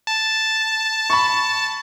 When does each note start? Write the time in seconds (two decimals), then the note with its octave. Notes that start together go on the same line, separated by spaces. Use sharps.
0.07 A5
1.10 B5 C#6